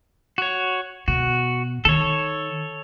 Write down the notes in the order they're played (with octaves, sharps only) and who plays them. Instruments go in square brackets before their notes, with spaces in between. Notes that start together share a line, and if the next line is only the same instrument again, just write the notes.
[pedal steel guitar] F#4 C#5
[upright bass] B2 [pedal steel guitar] F#4
[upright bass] D#3 [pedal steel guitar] A4 C#5